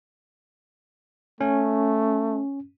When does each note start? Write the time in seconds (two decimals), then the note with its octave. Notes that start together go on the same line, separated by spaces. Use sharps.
1.41 A3 C#4